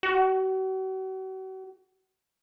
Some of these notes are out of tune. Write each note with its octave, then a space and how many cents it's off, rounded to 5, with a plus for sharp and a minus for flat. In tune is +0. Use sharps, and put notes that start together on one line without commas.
F#4 +40